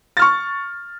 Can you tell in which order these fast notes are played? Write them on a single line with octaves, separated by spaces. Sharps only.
A6 F6 C#6